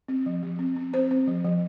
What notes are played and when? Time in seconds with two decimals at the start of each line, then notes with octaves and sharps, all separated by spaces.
0.08 C4
0.26 F3
0.43 F3
0.59 C4
0.76 C4
0.93 C4 C5
1.11 C4
1.27 F3
1.45 F3